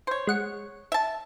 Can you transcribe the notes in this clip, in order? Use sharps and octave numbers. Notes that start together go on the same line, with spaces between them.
C5 C#5
G#3 F#5 C#7
E5 A5